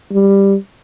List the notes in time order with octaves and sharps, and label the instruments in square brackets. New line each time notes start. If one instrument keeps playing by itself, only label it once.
[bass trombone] G3